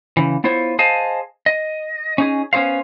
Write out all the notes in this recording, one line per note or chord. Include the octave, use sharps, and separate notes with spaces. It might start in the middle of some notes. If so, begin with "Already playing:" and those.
C#3 E3
B3 E4 F4 C5 C#5
G#4 C5 D#5 F5 A5
D#5
C#4 D#4 G#4
B3 C#4 A4 C5 F5